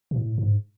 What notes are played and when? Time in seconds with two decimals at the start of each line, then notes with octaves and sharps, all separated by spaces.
0.11 B2
0.18 A2
0.38 G#2